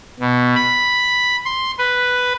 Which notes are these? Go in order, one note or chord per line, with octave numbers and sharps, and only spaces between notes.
B2
B5
C6
B4